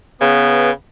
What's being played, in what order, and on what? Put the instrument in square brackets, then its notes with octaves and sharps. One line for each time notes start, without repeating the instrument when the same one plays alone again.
[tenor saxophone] C#3 [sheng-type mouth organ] B3 B4